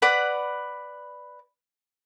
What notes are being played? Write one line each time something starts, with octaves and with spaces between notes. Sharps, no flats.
B4 D5 F#5 B5